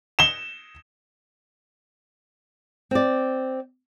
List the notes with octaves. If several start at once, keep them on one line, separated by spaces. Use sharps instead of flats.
E7 G7
C4 D5